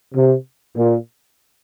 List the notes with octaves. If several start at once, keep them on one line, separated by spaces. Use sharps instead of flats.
C3
A#2